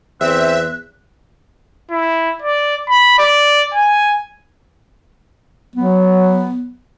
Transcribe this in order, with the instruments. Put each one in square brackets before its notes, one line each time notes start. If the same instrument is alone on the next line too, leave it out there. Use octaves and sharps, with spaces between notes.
[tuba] E2 [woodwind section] C4 [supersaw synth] E5 [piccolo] F#6
[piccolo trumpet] E4
D5
B5
D5
G#5
[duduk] F#3 [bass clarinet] B3